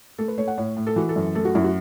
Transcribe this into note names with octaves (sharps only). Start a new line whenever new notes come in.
A3 A4
B4
A3 C#5
F#5
A2 C#5
A2
A4
E3 F#4
A4
F#2
A3 A4
F#4
F#2 E4
F#4